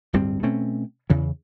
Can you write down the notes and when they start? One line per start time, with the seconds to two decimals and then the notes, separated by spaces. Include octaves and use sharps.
0.13 D1 G2 G3 C4
0.43 B2 A3 C4 C#4
1.10 E2 C#3 E3